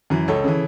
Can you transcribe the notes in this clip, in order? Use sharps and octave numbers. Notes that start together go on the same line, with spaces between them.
F#2 E3
C#2 A4 C#5
C#3 E3